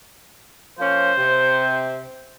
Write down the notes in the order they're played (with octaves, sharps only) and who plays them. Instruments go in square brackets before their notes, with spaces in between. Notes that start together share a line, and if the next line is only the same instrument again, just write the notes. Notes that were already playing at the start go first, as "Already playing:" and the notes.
[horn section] F3 A#3 C#4 [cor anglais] C5
[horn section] C3